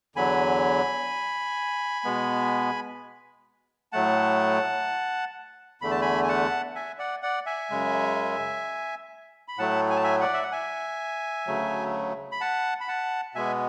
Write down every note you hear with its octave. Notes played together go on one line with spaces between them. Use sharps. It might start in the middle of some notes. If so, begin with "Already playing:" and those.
E2 D3 F#3 G#5 B5
B2 G#3 B3
A2 F#3 A3 F#5 A5
E2 D3 A3 B5
A5
G#5 B5
G#5
F#5 A5
E5 G#5
D5 F#5
D5 F#5
E5 G#5
F#2 C#3 G#3
B5
A2 F#3 A3 F#5 A5
G#5
A5
E5 G#5
D5 F#5
E5
F#5
E5 G#5
D2 C#3 F#3 A3
B5
F#5 A5
B5
F#5 A5
B2 G#3 B3 E5 G#5